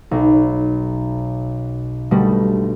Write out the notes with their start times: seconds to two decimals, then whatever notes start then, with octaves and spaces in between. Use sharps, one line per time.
0.11 B1
2.11 B2 D3 G3 A3